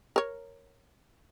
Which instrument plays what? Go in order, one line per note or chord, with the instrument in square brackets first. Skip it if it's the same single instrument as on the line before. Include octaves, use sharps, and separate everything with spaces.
[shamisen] A#4 C#5